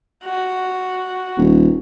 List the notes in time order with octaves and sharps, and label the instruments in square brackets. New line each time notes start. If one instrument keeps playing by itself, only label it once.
[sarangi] F#4
[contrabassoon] D#1